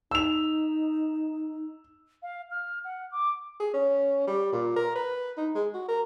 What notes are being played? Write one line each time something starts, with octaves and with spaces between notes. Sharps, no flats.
D#4 E6 F7
F5
F6
F#5
D6
G#4
C#4
G3
A#2
A#4
B4
D#4
G#3
F#4
A#4